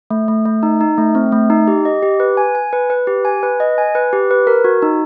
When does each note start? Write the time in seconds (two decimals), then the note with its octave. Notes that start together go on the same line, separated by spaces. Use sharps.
0.10 A3
0.28 A3
0.45 A3
0.63 D#4
0.81 D#4
0.98 A3
1.15 C4
1.32 A3
1.50 D#4
1.68 G4
1.85 D#5
2.03 G4
2.20 B4
2.37 G#5
2.55 G#5
2.73 B4
2.90 B4
3.07 G4
3.25 G#5
3.43 B4
3.60 D#5
3.78 G#5
3.95 B4
4.13 G4
4.31 B4
4.47 A#4
4.64 F#4
4.82 D#4